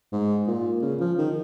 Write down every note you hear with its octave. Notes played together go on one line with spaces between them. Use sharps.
G#2
A#2
C#3
F3
D#3